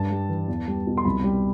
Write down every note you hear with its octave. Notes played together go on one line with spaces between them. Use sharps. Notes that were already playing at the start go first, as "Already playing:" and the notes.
Already playing: G2 A5
G3
E3
E2
G3
B2
C6
C2 B5
G3